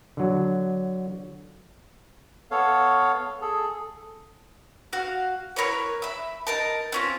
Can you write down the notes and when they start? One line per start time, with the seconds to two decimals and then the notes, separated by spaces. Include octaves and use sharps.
0.17 D3 F#3
2.51 B3 A4 C#5 F5
3.42 G#4 A4
4.93 F#4 F5
5.56 E4 A#4 B4 C#5
6.02 E5 B5
6.47 D#4 A#4 A5
6.92 C4 C#4 F4